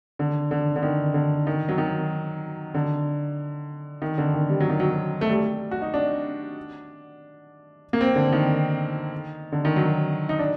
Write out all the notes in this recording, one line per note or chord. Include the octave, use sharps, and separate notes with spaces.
D3
D3
D3
D#3
D3
D#3
F#3
D#3
D3
D#3
D3
D#3
G3
F#3
D#3
F#3
A3
G3
F#4
D#4
D4
A#3
C4
D3
D#3
D3
D#3
F#3
D#4
D4